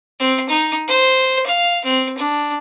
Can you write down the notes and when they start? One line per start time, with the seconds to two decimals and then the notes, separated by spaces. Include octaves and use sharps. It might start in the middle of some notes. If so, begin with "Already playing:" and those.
0.20 C4
0.49 D#4
0.88 C5
1.46 F5
1.85 C4
2.18 D4